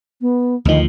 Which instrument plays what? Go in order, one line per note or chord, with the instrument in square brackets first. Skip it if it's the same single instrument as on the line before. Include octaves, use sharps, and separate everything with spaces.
[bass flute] B3
[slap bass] D2 F3 [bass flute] D#3